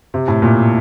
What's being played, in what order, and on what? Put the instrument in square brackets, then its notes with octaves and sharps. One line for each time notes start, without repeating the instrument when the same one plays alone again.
[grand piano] C3
A2
A#2